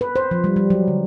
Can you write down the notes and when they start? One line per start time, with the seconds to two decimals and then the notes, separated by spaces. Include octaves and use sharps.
0.01 B4
0.16 C5
0.31 F3
0.44 G3
0.56 G3
0.70 F#3
0.88 D3